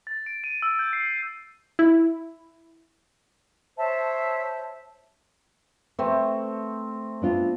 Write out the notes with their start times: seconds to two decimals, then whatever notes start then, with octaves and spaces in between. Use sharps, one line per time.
0.07 A6
0.26 D7
0.44 D#7
0.62 E6
0.79 G6
0.93 C7
1.79 E4
3.78 C5 C#5 E5 A5
5.99 A3 C4 B4
7.22 B3 D4 F4